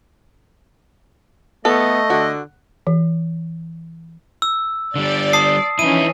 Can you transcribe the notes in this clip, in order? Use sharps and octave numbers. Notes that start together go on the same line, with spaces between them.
A3 B3 A4 D#5
D3 F#4
E3
E6
D3 G3 D5
A5 D#6 C7
E3 F3 C#4 D#4 E4 D#7